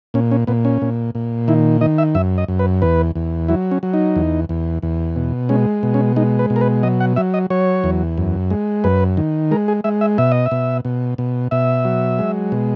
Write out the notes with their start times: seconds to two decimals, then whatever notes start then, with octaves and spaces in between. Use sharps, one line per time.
0.14 A#2 C#4
0.32 C#4
0.47 A#2 B3
0.65 C#4
0.82 A#2
1.15 A#2
1.48 D#3 E4
1.81 D#3 D#5
1.98 E5
2.15 F#2 E5
2.38 D#5
2.48 F#2
2.59 B4
2.82 E2 B4
3.15 E2
3.48 F#3 E4
3.71 C#4
3.83 F#3
3.94 D#4
4.16 E2
4.49 E2
4.82 E2
5.16 B2
5.49 G#3 C#4
5.83 B2
5.94 C#4
6.16 G#3 D#4
6.39 B4
6.50 B2
6.56 A#4
6.61 B4
6.83 F#3 D#5
7.00 F#5
7.16 F#3 E5
7.34 D#5
7.50 F#3 C#5
7.84 E2
8.18 F#2
8.50 G#3
8.84 F#2 B4
9.17 D#3
9.51 G#3 A#4
9.68 G#4
9.84 G#3 E5
10.01 E5
10.18 B2 E5
10.32 D#5
10.46 E5
10.51 B2
10.85 B2
11.18 B2
11.51 B2 E5
11.85 F#3
12.19 G#3
12.52 B2